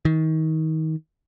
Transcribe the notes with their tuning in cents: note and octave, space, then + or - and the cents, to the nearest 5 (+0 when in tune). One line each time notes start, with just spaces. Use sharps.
D#3 +30